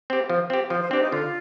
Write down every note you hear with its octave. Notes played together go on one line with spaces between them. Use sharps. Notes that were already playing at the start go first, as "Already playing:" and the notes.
C4 G4
F3
C4 G4
F3 C5
C5
C4 D4 G4
D#4
D3 F4